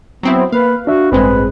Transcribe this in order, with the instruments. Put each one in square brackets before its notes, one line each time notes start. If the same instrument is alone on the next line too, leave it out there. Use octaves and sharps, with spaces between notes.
[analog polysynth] F#3 C4 E4 [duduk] B3
[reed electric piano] A#3 [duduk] B4 [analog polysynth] F5
[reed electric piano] D4 E5 [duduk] F#4
[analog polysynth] A1 G#3 [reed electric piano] G2 C4 [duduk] B4